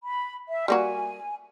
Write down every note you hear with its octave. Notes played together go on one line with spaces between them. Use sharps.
B5
E5
G3 A#3 F#4 G#5